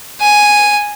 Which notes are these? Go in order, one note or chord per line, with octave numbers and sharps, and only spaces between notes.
G#5